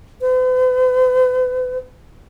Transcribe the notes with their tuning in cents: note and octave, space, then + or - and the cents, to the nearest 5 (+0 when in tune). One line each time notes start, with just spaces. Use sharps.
B4 +45